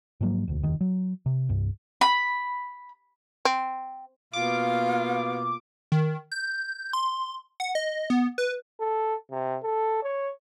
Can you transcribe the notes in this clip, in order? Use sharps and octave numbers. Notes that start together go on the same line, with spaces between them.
G#2 F3 F#3 A#3
E1 D2
F1 D#2 D#3
F#3
C3
C2 G2
B5
C4
B2 A#3 F4 F5 D6
D#3
G6
C6
F#5
D#5
B3
B4
A4
C3
A4
C#5